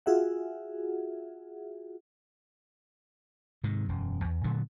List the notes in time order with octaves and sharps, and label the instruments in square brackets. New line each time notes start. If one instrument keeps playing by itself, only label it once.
[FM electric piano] F4 F#4 G#4 E5 F#5
[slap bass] G#2 C3 D#3
E1 F#2
E2
A#2 D3 F#3 A3